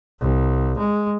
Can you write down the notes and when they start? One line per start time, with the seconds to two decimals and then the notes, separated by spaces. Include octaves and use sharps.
0.21 C2
0.78 G#3